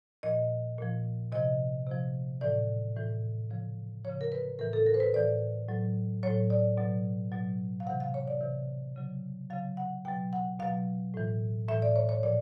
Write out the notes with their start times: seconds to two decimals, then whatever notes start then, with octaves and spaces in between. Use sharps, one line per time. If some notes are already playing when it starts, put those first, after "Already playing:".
0.23 A#2 F3 D#5
0.78 A#2 F3
1.32 C3 F3 D#5
1.87 C3 F3
2.41 A2 E3 D5
2.96 A2 E3
3.50 C#3 F3
4.05 F3 C#5
4.10 C#3
4.21 A#4
4.32 B4
4.59 A2 E3 A#4
4.73 A4
4.86 A#4
4.94 C5
5.00 B4
5.14 A2 E3 D5
5.68 A2 F#3
6.23 A2 F#3 C#5
6.50 D5
6.77 B2 F#3
7.32 B2 F#3
7.80 F5
7.87 C3 E3 F#5
8.00 F5
8.14 C#5
8.28 D5
8.41 C3 E3
8.96 C#3 F#3
9.50 C#3 F#3 F5
9.77 F#5
10.05 B2 F#3 G5
10.33 F#5
10.60 B2 F#3 F5
11.14 A2 E3
11.68 A2 E3 E5
11.82 D5
11.96 C#5
12.09 C#5
12.23 A#2 F3 D5